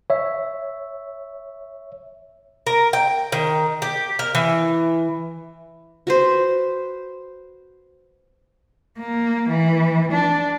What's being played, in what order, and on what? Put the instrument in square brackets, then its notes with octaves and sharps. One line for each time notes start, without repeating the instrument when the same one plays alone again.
[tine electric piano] C#5 E5
[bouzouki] A#4
G5
D#3
G4
A#4
E3
[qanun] F#4 B4 C5
[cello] A#3
E3
D4